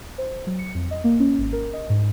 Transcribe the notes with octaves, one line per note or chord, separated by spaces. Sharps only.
C5
F#3
C#7
F2
D#5
A#3
C#4
G#1
A#4
D#5
G#2